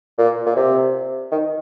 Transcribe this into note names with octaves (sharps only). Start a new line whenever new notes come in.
A#2
A#2
C3
D#3